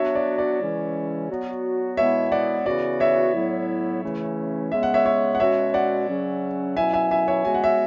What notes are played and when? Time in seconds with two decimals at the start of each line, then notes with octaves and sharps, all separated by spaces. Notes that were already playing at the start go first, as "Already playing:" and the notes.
Already playing: F#3 B3 D4 F#4 C#5 E5
0.15 D5
0.38 D5
0.60 C#3 E3 G#3 C#4 E4
1.30 F#3 B3 F#4
1.97 B2 G#3 B3 E4 C#5 E5
2.32 D5 F#5
2.66 C#3 E3 B3 F#4 D5
3.00 C#5 E5
3.34 A2 F#3 B3 E4
4.03 C#3 E3 A3 C#4 E4
4.72 C#3 G#3 B3 E5
4.83 F#5
4.94 C#5 E5
5.06 C#5 E5
5.35 F#5
5.40 B2 G#3 C#4 F#4 C#5 E5
5.74 D5 F#5
6.08 C#3 F#3 C#4
6.76 B2 F#3 C#4 E4 E5 G#5
6.93 E5 G#5
7.11 E5 G#5
7.28 C#5 E5
7.45 C#3 G#3 B3 F#4 G#5
7.54 F#5
7.64 E5